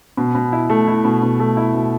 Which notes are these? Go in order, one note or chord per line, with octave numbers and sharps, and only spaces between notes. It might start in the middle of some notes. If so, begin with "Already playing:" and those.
B2
B2
E4
A3
E4
B2
B2
A3
E4
B2